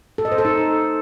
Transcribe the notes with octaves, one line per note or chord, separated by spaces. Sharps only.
A4
D#5
C5
A4
D#4